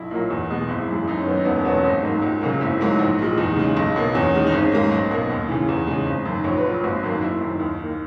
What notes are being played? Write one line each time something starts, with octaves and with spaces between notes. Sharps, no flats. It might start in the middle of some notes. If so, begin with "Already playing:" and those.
Already playing: B1 E4
A#2 F#3 A#3
E2
B2 G#3
G#1 E4
F#2 E3 G#3
F#2 D#4
C#4
D#3 F#3 B3
D#4
E1 B3
C#4
E2 B2 F#3 B3
C#4
G#1 D#4
G#2 F#3 A#3
C#2
C#3 F#3 A#3
G#1 E4
G#2 F#3 A#3
A#1
A#2 G#3
E2 D#4
C#3 G#3
B1
B2 F#3 A#3
E2 C#4
D#3 G#3
D#4
G#1 C#4
G#2 D#3 A#3
B1
B2 A#3
D#2
C#3 E3
E2 G#4
C#3 G#3
G#1
F#2 D#3
A#1 C#5
B4
A#2 F#3
G#1 F#4
F#2 D#3 A#3
F#1 E4
F#2 D#3
D#2
D#3 A#3